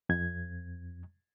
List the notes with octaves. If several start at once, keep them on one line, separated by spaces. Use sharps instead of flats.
F2 G#6